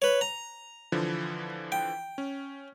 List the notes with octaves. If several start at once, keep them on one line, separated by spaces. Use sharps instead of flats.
B4 C#5
A#5
D3 E3 F3
G5
C#4